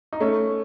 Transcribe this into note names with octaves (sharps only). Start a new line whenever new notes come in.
D#4
A3 C#4